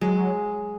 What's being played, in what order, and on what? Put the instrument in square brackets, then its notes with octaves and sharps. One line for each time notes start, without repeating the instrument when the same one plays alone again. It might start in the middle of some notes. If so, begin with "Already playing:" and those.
[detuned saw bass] F#3 [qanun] G#3